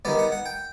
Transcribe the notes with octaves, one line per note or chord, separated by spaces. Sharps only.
D#3 G3 B3 D5
F#5
F#5
G5